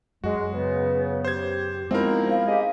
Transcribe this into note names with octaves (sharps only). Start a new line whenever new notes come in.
F#2 G#3 F#4
C#3 B3 B4
G4 C5 G#6
F3 G#3 B3 C4 D#4 E4 A#4
F5
G#3 G4 D#5